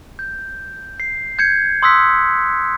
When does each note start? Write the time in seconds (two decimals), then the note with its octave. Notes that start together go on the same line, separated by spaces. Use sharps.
0.19 G6
1.00 C7
1.39 G6 G#6 C#7
1.83 C6 D#6 E6 F#6 B6